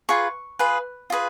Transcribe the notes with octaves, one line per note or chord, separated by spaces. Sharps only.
F4 G#4 B4 C#6
F4 G#4 B4
F4 G#4 B4